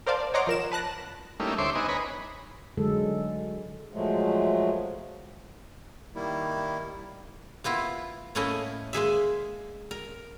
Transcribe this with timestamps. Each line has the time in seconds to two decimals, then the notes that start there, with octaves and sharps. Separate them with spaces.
0.06 A#4 C5 D5 F5 A5
0.19 D5
0.34 C#5 D#5 F#5 A#5 C6 D6
0.47 F3 A#4 E7
0.72 B4 A5 F#6 A#6
1.40 G3 A3 A#3 C#4 D#4 E4
1.58 D2 C5 C#5 E5 C6 D6
1.75 B3 D#4 D#5 G#5
1.89 B4 C#5 G#5 A#5 B5
2.77 D3 F#3 G#3 A4
3.93 A#2 F3 F#3 G#3 A3
6.15 D#3 G3 A#3 E4
7.64 A#3 B3 E4 F4
8.35 A2 A3 A#3 C#4 E4 D#5
8.93 G#3 A#3 G#4 E5
9.91 A#4